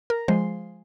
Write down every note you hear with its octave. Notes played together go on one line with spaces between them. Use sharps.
A#4
F3 G#3 C5